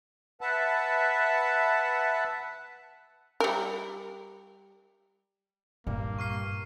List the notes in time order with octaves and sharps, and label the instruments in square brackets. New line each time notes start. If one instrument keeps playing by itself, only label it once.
[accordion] B4 E5 F#5 A5
[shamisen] G3 A#4
[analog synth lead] G2 [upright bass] A#2 [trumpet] A#3
[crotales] C#6 F6 C7